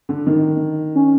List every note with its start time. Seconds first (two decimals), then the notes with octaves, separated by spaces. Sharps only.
0.09 D3
0.27 D#3
0.95 C#4